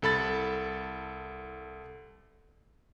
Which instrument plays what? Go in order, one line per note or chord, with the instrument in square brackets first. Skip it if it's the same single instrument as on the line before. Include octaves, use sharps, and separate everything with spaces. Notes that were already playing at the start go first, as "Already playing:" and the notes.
[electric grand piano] C2 A4 B5 A6